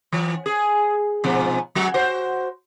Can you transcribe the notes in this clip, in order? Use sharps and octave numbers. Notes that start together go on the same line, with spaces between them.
E3
G#4
G#2 B2 F3
F#3 F#4
F#4 C5